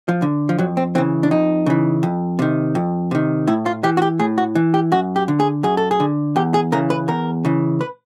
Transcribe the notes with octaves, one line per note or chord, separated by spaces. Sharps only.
F3
D3
F3
F2 F#3
C4
C#3 E3 C4
D4
F2 D#4
C#3 E3
F2
C3 D#3
F2
C3 D#3
A2 E4
F4
E3 G4
F#4
G4
A2 G#4
F#4
E3
G4
F#2 F#4
G4
D3
G#4
F#2 G#4
A4
G#4
D3
E2 G4
G#4
C#3 E3 A#4
B4
E2 A#4
C#3 E3
B4